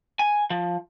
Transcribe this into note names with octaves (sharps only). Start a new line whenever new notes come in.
G#5
F3